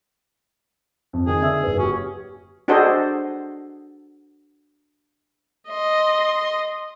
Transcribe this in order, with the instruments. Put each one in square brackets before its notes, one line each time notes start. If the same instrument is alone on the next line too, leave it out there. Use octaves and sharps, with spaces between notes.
[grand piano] F2
[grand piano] D#3 [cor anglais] G#4
[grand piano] D3 E5 E6
F#1 B4
[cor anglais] C#4 [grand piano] F#4 G4
[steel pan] D4 F#4 G#4 A4 C5 D#5
[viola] D#5 C6